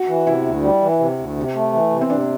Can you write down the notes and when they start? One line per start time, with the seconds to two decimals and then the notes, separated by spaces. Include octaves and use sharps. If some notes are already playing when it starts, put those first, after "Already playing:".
Already playing: F#4
0.08 E3
0.26 C3 E4
0.45 D2
0.63 G3
0.82 E3
0.99 C3
1.18 D2
1.37 C3
1.55 A3
1.73 E3
1.91 C3
2.01 C4
2.10 C3 D4